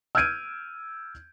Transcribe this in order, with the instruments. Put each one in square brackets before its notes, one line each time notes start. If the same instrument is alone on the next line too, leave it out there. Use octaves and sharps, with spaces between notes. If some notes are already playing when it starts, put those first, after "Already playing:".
[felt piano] E6 F6 G6 G#6 D7 D#7